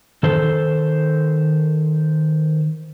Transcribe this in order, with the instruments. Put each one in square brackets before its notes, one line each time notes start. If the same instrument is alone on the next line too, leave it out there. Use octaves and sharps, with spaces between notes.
[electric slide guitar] D#3 A4 C5